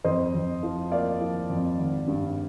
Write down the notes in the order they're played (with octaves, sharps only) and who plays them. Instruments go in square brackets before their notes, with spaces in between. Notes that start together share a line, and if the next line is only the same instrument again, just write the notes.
[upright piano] F2 C5 D#5
F2
F3
A#3 D5 F5
F3
F2
G#1
G2